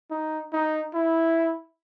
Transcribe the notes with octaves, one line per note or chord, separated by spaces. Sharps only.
D#4
D#4
E4